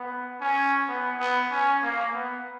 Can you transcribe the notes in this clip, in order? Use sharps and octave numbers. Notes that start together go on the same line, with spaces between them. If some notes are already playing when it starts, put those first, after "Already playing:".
Already playing: B3
C#4
B3
B3
C#4
A#3
B3